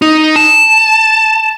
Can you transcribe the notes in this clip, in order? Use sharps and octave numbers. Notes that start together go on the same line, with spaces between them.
D#4
A5